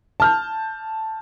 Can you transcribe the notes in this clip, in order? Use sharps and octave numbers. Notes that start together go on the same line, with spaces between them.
A5 F6 G6